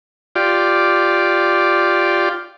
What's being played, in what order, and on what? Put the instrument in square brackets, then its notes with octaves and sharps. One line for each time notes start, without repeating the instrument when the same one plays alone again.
[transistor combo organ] F4 G4 D5